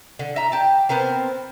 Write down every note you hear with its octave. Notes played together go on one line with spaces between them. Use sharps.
D3
E5 A#5
G4 A5
B3 C4 A#4 C5